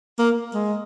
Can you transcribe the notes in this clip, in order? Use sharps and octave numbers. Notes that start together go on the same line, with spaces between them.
A#3
G#3